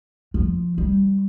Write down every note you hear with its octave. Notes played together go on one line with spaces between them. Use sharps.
F3
G3